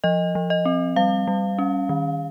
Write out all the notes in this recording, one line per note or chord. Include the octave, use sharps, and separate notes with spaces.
F3 D#5
F3
D#5
C4
G3 F5
G3
C#4
D#3